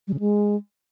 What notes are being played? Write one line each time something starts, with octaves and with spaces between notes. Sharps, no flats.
G3
C#3
G#3